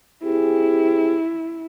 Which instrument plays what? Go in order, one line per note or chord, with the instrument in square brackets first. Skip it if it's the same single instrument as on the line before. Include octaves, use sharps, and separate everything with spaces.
[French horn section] C4 G4 G#4 [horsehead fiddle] E4